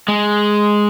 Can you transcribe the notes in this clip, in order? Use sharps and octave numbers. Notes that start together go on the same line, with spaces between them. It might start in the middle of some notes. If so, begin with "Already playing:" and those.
G#3